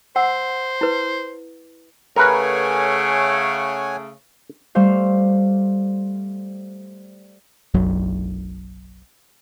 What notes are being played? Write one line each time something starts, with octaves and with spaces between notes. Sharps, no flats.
C5 F#5 E6
E4 B4
C#3 A3 A#4 B4 C#5 F#5 G#5
G3 A3 C5 F5
F#1 B1 F#2 F#3